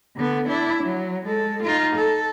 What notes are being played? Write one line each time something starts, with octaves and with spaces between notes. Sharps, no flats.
D3 B3
D4 E4
F#3
G#3 A4
D#4 F4
A4